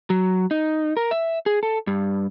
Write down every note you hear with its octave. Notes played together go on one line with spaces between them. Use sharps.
F#3
D#4
A#4
E5
G#4
A4
G2